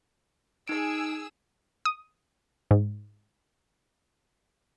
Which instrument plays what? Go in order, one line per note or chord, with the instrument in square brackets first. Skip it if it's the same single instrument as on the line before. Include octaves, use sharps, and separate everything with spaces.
[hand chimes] D#4 D7 [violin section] G#4 E6
[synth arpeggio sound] D#6
G#2